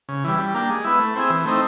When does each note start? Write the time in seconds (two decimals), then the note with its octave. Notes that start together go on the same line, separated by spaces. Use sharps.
0.09 C#3
0.24 E3 G3
0.39 G3
0.54 A#3 D4 G4
0.69 G#3
0.84 B3 E4
0.99 A3
1.16 C4 E4 G#4
1.30 E3
1.45 A3 C4 D#4